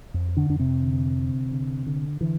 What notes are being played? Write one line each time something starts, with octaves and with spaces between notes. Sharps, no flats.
F2
D3 D4
F2 D4
C3 C4
D3
D3
D3
D3
D3 E3